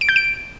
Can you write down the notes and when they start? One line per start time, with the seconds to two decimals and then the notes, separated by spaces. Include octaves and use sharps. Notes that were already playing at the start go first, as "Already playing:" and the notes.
0.01 D7
0.09 G6
0.16 D7